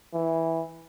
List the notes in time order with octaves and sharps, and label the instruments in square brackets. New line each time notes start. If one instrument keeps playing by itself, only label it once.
[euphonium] E3